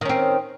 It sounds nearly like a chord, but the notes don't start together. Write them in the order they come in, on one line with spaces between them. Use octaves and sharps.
D#3 C#4 C4